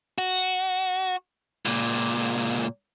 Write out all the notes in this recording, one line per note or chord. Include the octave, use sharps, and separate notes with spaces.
F#4
C#2 A#2